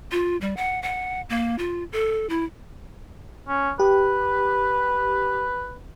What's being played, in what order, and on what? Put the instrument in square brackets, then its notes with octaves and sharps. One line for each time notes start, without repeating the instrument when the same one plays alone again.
[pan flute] F4
G3
F#5
F#5
A#3
F4
A4
E4
[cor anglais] C#4
[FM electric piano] G4 [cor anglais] B4